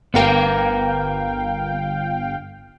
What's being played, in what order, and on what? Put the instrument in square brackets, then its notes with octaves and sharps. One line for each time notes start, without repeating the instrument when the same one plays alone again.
[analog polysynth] G1 F5 G5 [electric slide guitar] B3 A#4